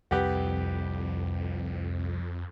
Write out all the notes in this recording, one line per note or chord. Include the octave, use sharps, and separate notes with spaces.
C2 F2 G4 B4 F#5